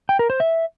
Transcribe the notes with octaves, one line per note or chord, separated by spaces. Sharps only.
G5
A#4
C5
E5